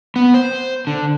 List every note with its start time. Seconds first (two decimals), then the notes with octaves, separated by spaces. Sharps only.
0.16 B3
0.34 C5
0.87 D3